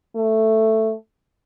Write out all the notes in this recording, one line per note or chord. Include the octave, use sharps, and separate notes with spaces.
A3